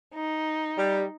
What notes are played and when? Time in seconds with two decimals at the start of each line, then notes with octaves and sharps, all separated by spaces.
0.15 D#4
0.77 G3